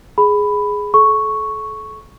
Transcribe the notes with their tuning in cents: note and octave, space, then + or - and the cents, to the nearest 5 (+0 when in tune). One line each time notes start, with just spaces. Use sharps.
G#4 +0 B5 +5
A4 -35 C#6 +0